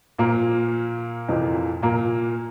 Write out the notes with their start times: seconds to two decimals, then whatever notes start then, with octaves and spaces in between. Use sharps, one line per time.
0.19 A#2 F3 A#3
1.28 F2 C3 E3
1.82 A#2 A#3